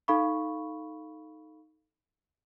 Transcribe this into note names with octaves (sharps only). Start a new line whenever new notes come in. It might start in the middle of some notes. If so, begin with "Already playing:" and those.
D#4 A4 F5 B5 C#6